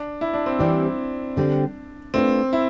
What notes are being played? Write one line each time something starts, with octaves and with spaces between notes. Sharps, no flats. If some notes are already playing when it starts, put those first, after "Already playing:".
Already playing: D4
E4
D4
C4
E3 G3 C4 D4 G4
D3 G3 C4
A3 C4 D4 F4 B4
E4